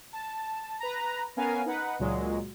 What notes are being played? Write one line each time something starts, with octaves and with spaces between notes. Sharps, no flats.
A5
B4 A#5
B3 C#4 A#4 F5 G#5
D#4 B4 F#5
C#2 A#2 F#3 G#3